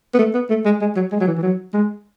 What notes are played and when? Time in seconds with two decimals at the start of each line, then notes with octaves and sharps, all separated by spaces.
0.14 B3
0.19 A3
0.34 B3
0.50 A3
0.65 G#3
0.81 G#3
0.96 F#3
1.12 G#3
1.20 F#3
1.27 E3
1.37 E3
1.42 F#3
1.74 G#3